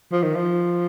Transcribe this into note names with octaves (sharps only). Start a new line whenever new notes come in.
F3
D#3
F3